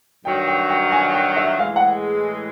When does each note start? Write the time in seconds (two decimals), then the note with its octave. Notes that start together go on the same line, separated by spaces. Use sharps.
0.25 G2 D#3 F#3 G5
0.47 G5
0.70 G5
0.92 G#5
1.14 G5
1.36 E5
1.59 A2 E3 G#3 F5
1.76 F#5